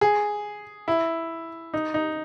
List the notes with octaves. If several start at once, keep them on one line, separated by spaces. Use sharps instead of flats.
G#4
E4
D#4
D#4